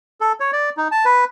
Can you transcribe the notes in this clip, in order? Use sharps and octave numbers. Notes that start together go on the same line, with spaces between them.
A4
C#5
D5
D#4
A5
B4